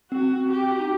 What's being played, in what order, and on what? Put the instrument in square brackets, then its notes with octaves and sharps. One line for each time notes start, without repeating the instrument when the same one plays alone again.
[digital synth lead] C4 [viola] F#4
[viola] G4
[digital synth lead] F#4
D#4